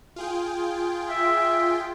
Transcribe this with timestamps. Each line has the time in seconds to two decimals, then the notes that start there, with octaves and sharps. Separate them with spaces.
0.16 F4 G#4 G5
1.10 E5